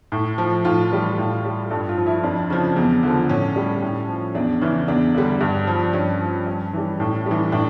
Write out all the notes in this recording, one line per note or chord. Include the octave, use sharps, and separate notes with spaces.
A2
F3
A2 F4
E3 G3
A2
G3
G2 A4
F4
F3
E4
F2 D4
C#3 F3
E2
D3 F3
A2 C#4
G3
A2
F3
E2 D4
C#3 E3 E4
E2 D4
D3 G3
G2
F3
G2 C#4
F3
G2
E3 G3
A2
E3 G3
A2 D4